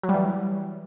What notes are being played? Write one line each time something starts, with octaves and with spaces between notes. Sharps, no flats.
F#3
G3
E3